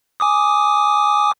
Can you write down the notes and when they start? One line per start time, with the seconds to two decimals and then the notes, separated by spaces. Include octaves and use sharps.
0.20 G#5 D6 D#6